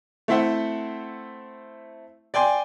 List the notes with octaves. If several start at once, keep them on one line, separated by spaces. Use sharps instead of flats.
A3 C4 E4 C5 E5 F#5
D5 G5 G#5 C6